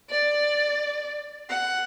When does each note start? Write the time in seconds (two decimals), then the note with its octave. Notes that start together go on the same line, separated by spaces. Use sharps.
0.11 D5
1.50 F#5